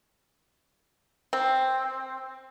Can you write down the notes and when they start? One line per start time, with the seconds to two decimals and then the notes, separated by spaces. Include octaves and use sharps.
1.33 C4